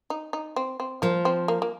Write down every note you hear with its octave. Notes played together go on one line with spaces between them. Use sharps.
D#4
D#4
C4
C4
F3 A#3
C4
A#3
A#3